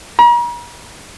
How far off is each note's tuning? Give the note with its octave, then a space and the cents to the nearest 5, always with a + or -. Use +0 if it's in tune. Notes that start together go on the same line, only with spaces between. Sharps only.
A#5 +45